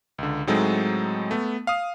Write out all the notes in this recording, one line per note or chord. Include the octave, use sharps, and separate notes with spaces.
C#2 D3
A2 F#3 G#3 C4 D#4 A4
A3 B3
F5 D#6